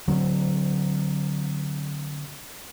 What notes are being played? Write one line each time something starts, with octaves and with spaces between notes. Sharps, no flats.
D3 F#3 C4